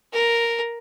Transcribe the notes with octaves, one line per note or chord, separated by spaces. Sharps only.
A#4